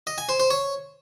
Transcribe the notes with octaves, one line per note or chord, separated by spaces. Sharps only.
D#5
G#5
C5
C5
C#5